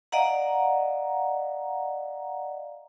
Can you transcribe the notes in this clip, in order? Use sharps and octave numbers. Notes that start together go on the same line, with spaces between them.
D5 D#5 F5 F#5 A#5